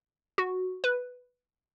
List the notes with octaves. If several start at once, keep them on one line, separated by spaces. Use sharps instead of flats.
F#4
B4